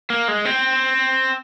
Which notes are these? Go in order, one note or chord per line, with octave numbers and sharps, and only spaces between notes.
A#3
G#3
C4